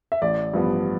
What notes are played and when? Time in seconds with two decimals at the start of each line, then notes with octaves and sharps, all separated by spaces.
0.12 E5
0.22 A1 D5
0.54 G2 F3 B3